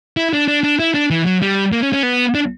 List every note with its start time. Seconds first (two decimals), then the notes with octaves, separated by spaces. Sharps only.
0.17 E4
0.33 D4
0.48 D4
0.63 D4
0.80 E4
0.94 D4
1.10 E3
1.26 F#3
1.42 G3
1.72 A#3
1.82 C#4
1.93 C#4
2.03 B3
2.35 D4